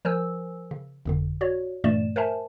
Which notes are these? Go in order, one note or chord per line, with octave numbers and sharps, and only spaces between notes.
F3 A#4 C5 G#5 E6
C#3
G1 F2 D3
F#4 C#5 D5
G2 A#2 E3 A3 D5 E7
A#4 C5 E5 G#5 A5